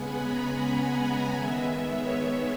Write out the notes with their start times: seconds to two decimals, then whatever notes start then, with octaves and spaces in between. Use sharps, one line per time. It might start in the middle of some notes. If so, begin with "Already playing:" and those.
Already playing: C#3 G#3 B3 F#5 G#5 B5
0.20 A#5
0.77 G#5
1.33 D#3 G#3 B3 E5
1.90 C#5